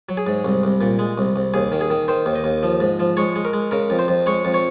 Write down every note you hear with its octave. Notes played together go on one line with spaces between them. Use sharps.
F#3
G#4
G#2
C2
C2
A#2
G#3
C2
C2
D#2 G#4
D#3
G#4
D#3
D#3 C5
D#2
D#5
D#2
F3
G#2
F3
G#3 C#5
G#3
A#4
G#3
C#3 A#4
F2
C5
F2
G#3 C#5
F2
C#5